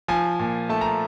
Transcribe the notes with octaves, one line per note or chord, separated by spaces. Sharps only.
F3 G#5
A#2
A3 A5
A#5